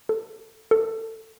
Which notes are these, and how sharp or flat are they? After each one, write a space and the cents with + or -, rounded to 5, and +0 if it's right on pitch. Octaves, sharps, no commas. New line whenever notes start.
A4 +15
A4 +20